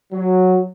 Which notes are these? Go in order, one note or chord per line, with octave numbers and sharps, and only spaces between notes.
F#3